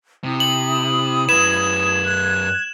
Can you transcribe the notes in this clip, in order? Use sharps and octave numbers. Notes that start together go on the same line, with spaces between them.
C3 E4 D#6
F#7
F#2 B4 G#6 E7
F#6